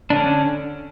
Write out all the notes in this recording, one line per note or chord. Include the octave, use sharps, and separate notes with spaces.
D3 C#4 D4